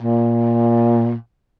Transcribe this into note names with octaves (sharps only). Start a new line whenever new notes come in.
A#2